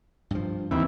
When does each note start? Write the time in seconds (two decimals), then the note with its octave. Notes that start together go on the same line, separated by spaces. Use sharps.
0.31 G2 F3
0.71 D#2 E3 C4